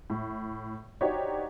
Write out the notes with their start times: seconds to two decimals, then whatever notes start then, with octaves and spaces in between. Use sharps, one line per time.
0.10 A2
1.01 D4 D#4 F#4 G4 C5 C#5